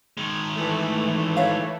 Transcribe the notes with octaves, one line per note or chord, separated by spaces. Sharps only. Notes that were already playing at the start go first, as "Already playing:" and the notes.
D#3 G#3
E3 A3
C#5 E5 F5